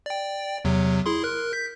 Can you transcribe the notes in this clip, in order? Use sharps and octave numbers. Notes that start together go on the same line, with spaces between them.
D5 G5
E2 C3 F#3
E4 G#4 C6
A#4 F#6
G6 B6